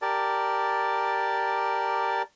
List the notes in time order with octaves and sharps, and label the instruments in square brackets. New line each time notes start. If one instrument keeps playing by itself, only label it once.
[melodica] G4 A#4 D5 A5